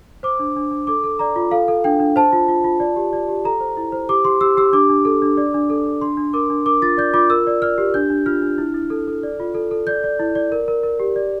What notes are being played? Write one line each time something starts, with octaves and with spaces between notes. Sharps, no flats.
C5 D6
D4
D4
D4
A4 D6
A4
D5 A#5
F4
A4 F5
A4
D4 G5
D4
C5 A5
F4
F4
F4
D5
G4
D5
G4
A4 A#5
C5
E4
C5
G4 D6
G4 C6
G4 E6
G4 E6
D4 D6
D4
A4
D4
D5
D4
A4
D4
D4 C6
D4
A#4 D6
D4
A#4 D6
F4 A6
D5 G6
F4 D6
A#4 E6
D5
D5 F6
G4
D4 G6
D4
F4 F6
D4
E4
E4
A4
A4
D5
F4
A4
A4
D5 G6
D5
E4
D5
A#4
A#4
A#4
G4
D5